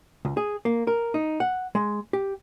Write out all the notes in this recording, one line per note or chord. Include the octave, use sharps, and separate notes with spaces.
C#2
G#4
A#3
A#4
D#4
F#5
G#3
G4